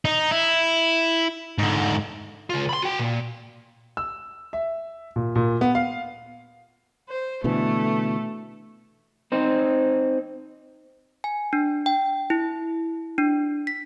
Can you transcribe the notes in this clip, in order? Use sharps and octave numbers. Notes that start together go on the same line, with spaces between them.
D#4
E4
G#2 D3
C#2 F4
B5 C6
F#4 G5
A#2
E6
E5
A#2
A#2
B3
F5
C5
B2 D3 E3 A3
C4 D#4 C5
G#5
D4
G5
E4
D4
B6